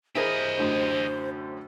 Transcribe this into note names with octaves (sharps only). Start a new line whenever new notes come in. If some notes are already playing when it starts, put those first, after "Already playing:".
E4 G4 G#4 A#4 C5 D#5
F#2 A2 D3